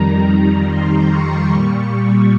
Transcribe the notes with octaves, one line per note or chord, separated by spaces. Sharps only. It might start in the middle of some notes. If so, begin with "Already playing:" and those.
Already playing: F2 D#3 G3 A#5
C6
C#6
A#2 G3